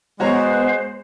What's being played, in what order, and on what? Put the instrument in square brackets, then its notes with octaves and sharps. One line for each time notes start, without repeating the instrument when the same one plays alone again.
[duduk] G#3 [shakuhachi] B3 [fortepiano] F#4 C#5 A#5 [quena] C5